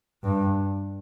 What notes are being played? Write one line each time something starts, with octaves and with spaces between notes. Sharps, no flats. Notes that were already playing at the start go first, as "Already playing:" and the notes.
G2